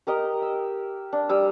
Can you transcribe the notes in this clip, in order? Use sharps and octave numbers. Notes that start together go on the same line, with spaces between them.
G4 A#4 D#5
E6
D4
G3 E6